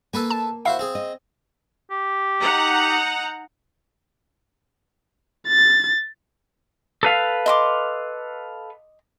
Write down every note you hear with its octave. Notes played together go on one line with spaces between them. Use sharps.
A#3 A4 B4 G#5
A5
E4 F#4 C5 F5
C4 G#4
D#5
G4
D#4 F#5 A#5
A6
A4 B4 F5
D#5 C6 D6